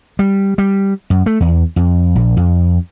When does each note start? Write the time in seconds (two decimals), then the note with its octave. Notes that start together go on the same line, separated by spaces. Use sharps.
0.19 G3
0.58 G3
1.10 F#2
1.26 A3
1.40 E2
1.76 F2
2.15 A#1
2.37 F2